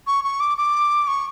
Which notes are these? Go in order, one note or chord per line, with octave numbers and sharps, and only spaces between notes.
C#6
C#6
D6
D6
C#6